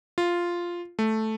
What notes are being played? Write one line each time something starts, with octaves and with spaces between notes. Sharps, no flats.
F4
A3